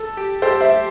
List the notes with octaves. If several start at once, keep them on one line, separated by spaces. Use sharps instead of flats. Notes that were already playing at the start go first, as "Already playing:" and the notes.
Already playing: A4
G4
G4 A4 C5
C5 E5